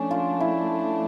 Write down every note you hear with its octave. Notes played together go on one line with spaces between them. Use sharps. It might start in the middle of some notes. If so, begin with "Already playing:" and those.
Already playing: F3 A3 C#4 D4
F4
E4